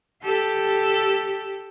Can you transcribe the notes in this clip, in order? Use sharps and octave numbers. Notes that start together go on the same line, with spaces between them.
G4 A4